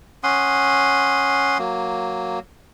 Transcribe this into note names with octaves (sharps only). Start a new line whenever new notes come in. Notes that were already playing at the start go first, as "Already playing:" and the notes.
C#4 F#5 C6 D#6
F#3 A#3